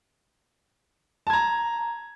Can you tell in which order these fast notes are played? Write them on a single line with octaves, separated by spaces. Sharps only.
A5 G#6 A#5